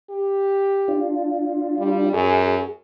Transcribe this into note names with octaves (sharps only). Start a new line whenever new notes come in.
G4
D4 F4
G3
F#2 G#4